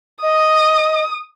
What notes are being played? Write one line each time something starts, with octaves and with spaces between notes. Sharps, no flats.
D#5 D#6